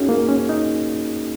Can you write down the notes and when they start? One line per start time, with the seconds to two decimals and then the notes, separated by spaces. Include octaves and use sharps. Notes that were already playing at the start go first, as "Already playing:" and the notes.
Already playing: C#4 D#4 F#4 G#4
0.09 A#3
0.29 C#4
0.49 D#4